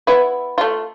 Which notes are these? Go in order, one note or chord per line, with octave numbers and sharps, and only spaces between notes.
B3 E4
A3 F4